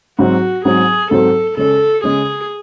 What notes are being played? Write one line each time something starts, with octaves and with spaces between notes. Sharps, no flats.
G#2 F#3 C4 F#4
G#2 F#3 C4 G#4
G#2 F#3 C4 A4
C#3 G#3 C#4 A4
C#3 G#3 C#4 G#4